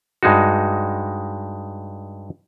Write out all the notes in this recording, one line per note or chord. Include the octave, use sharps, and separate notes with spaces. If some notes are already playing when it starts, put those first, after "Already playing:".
G2 G#3 D#4 F#4